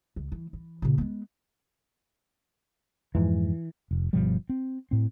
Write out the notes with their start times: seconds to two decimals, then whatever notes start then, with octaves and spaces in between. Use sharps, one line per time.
0.16 C#2
0.32 E3
0.53 E3
0.82 A#2 C#3
0.98 G#3 B3
3.15 F2 G#2 E3
3.91 F1
4.13 G1 B2 F3 G3
4.49 C4
4.91 A2 C4